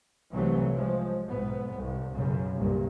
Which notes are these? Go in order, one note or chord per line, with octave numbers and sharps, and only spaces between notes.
C2 C3 E3 F#3 A3
F3 G#3
B1 G#2 B3
C2
B1 F#2 C#3
C2 G2 A#2